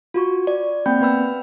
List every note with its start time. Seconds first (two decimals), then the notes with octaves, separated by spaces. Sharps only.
0.14 F4 F#4 C#6
0.47 D5
0.86 A#3 C4 D5 G5 B5 G6
1.01 B3 B4 B5 E6